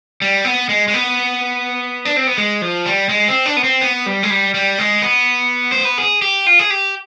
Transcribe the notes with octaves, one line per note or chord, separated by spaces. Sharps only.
G3
B3
G#3
G#3
B3
D4
C4
B3
G#3
F3
G3
G#3
C4
D4
B3
C4
B3
G3
G#3
G3
G3
G#3
B3
C5
B4
G#4
G4
F4
G#4
G4